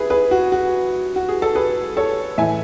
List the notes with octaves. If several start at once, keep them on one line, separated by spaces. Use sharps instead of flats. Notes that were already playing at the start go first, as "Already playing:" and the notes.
Already playing: G#4 B4 E5
G#4 B4
F#4
F#4
F#4
G#4
A4
G#4 B4
A4 C#5
A2 E3 E5 G#5